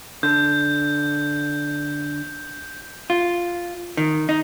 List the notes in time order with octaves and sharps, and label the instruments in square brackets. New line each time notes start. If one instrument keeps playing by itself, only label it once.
[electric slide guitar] D3 [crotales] G6
[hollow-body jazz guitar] F4
D#3
D#4